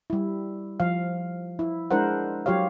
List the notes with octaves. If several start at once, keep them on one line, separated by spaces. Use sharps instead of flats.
G3 E4
F3 F5
E4
G#3 D4 E4 A#4 C5 F#5
F#3 F4 G4 C#5 F5